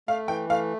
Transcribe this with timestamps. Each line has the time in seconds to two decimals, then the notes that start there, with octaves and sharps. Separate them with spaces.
0.08 A3 F5
0.28 E3 G5
0.50 A3 F5